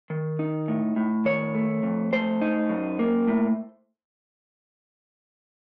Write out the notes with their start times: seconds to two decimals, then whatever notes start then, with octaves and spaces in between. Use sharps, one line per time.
0.10 D#3
0.39 D#4
0.68 A2
0.96 A2
1.25 D#3 C#5
1.55 A3
1.83 F2
2.13 A3 C5
2.42 D#4
2.69 F#2
2.99 A#3
3.28 A2